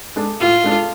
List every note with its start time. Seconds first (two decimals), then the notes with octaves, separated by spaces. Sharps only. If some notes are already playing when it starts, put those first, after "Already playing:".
0.16 G#3 D4 A4
0.40 A2 F4
0.64 G#3 D4 A4